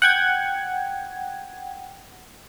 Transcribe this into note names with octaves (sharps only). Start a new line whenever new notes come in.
F#5 G5 G#6